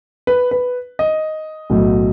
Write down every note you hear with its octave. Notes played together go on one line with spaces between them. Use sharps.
B4
B4
D#5
B1 A2 F#3 A3